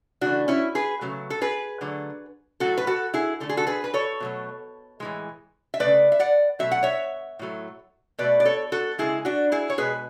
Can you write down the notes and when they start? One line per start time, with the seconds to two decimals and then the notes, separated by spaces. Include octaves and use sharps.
0.21 C#3 E3 A3 D4 F#4
0.48 C#4 E4
0.75 G#4 B4
1.01 C#3 F#3 A3
1.30 A4
1.41 G#4 B4
1.81 D3 F#3 A3
2.60 A2 F#3 A3 F#4 A4
2.78 B4
2.87 F#4 A4
3.14 E4 G#4
3.40 D3 A3 A4
3.49 G#4
3.57 F#4 A4
3.67 G#4 B4
3.84 B4
3.94 A4 C#5
4.20 B2 F#3 A3
5.00 A2 E3 G#3
5.74 E5
5.80 C#3 F#3 A3 B4 D5
6.12 E5
6.19 D5 F#5
6.59 B2 F#3 A3 E5
6.71 F#5
6.83 C#5 E5
7.39 A2 F#3 A3
8.19 B2 A3 B4 D5
8.40 D5
8.45 A4 C#5
8.72 F#4 A4
8.98 C#3 G#3 E4 G#4
9.25 D4 F#4
9.52 E4 G#4
9.70 C#5
9.78 B2 G#3 G#4 B4